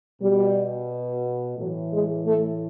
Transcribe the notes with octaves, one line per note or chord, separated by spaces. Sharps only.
B2 G3
A2 E3 F#3
G#3
A3